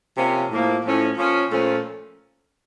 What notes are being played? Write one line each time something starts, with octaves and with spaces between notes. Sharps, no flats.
C3 F3 A#3 C#4
A2 F3 A#3
A2 F3 A3 C#4
F3 A#3 C#4
A#2 F3 A3 C#4